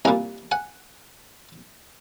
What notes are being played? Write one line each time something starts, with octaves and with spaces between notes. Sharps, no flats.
C2 A#2 G3 G#5 A#5
F#5 G#5